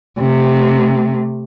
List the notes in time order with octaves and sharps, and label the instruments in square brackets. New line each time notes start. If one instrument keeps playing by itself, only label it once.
[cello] C3 A3